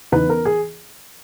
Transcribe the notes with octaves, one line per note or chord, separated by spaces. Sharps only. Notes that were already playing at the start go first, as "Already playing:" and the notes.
E2 C#3 E3 B3 D#4 B4
A#4
G#4